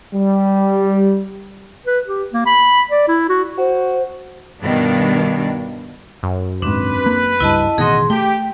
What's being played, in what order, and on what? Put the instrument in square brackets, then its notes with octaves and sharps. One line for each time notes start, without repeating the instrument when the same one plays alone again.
[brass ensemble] G3
[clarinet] B4
G4
A#3
B5
D5
E4
F#4
[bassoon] F#4 [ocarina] C5
[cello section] G2 B2 D#3 D4
[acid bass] F#2
[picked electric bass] D#1 G#2 [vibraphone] C4 D4 [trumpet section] B4
[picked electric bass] A#3
[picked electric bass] C#2 G2 [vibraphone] E4 D#5 A5
[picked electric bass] A1 B2 D#3 [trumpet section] F#4 D#5 [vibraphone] G#4 C6
[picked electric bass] A3 [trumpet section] G4 [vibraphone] G5